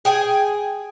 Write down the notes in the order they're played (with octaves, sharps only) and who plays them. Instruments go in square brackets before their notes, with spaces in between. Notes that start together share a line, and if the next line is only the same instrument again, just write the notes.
[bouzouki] G#4 G5 G#5